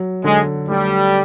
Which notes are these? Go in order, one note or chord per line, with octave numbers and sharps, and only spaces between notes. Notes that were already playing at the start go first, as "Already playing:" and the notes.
Already playing: F#3
D3 G#3
G3 A3